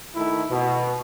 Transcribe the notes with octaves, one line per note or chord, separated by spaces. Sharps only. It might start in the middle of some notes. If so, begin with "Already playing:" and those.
D#3 A3 E4
B2